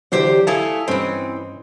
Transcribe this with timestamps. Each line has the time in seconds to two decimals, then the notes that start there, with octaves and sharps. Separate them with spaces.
0.12 D3 E3 F#3 G4 C5 D5
0.47 A3 E4 A4 F5 G#5 D#6
0.88 G2 E3 C4 C#4 D#5